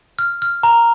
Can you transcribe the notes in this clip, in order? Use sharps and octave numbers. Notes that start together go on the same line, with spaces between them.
F6
F6
A#5